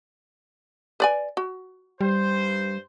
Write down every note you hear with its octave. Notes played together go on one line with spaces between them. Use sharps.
B4 D5 G#5
F#4
G2 G3 C5